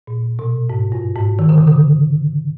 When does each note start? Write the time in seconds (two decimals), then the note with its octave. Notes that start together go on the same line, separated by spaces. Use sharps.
0.07 A#2
0.39 B2
0.70 G#2
0.92 G2
1.16 G#2
1.39 D#3
1.49 D3
1.58 C#3
1.67 D3